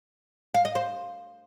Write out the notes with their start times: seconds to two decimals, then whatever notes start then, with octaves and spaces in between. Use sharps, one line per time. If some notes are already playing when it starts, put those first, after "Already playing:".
0.54 F5
0.65 D#5
0.75 C5